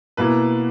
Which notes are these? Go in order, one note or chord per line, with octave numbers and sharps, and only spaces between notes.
B2 A#3 E4 B4